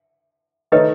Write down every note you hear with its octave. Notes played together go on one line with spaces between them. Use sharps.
D#3 A3 D#4 A4 B4 C#5 D#5